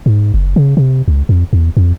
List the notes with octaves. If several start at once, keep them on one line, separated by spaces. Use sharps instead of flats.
G#2
F#1
C#3
C3
C#2
F2
E2
F2